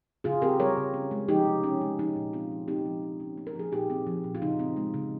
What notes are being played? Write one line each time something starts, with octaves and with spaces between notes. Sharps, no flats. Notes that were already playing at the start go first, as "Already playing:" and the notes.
C#3 F4 G#4
C4 G4 A#4
G3 A#4 C#5
C#3
C#4
G#3
F3 D#4 G4
C3
C#4
G#3
F3 D#4
A#2
C4 F4
F3
C4 D#4 G4
F3
F3
C#4
A#3
A#4
F3 G#4
A#2 D#4 G4
C4
F3
A#2
F4
C#3 D#4
C4
G#3
C#3